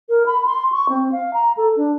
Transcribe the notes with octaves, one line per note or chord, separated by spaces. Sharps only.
A#4
B5
C6
C#6
C4
F5
A#5
A4
D4